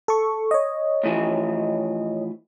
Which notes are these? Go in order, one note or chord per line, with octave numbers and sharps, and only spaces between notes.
A4 C#6
C#5 D#5
A2 E3 F3